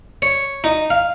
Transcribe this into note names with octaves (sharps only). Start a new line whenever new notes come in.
C#5
D#4
F5